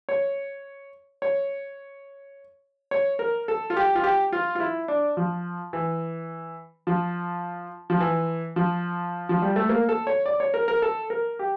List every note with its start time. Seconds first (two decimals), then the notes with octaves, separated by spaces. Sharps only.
0.09 C#5
1.22 C#5
2.91 C#5
3.19 A#4
3.48 A4
3.70 F4
3.76 G4
3.95 F4
4.04 G4
4.32 F4
4.55 F4
4.60 E4
4.88 D4
5.17 F3
5.73 E3
6.87 F3
7.90 F3
8.00 E3
8.56 F3
9.29 F3
9.42 G3
9.56 A3
9.69 A#3
9.89 A4
10.07 C#5
10.26 D5
10.40 C#5
10.54 A#4
10.68 A#4
10.82 A4
11.10 A#4
11.39 G4